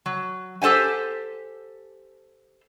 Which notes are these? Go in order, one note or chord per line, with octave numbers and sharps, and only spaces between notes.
F#3
G4 A4 C5 F#5 G#5